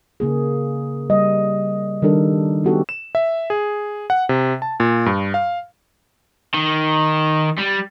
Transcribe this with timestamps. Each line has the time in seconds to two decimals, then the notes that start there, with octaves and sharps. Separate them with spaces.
0.20 C#3 A#3 G#4
1.10 G3 D#5
2.02 D#3 G3 D4 A4 A#4
2.64 B3 C#4 D#4 F#4 G4 A4
2.89 E7
3.15 E5
3.50 G#4
4.10 F#5
4.29 C3
4.62 A5
4.80 A#2
5.06 G2
5.34 F5
6.54 D#3
7.58 G3